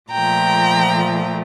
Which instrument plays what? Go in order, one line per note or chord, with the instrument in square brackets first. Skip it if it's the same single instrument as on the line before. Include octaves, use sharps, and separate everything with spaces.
[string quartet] A#2 F3 A3 G5 A#5